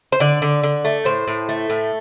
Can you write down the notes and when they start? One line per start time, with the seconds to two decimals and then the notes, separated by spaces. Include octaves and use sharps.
0.12 C5
0.20 D3 D5
0.42 D3
0.63 D3
0.85 A3
1.05 A2 C5
1.28 A2
1.49 A3
1.70 A2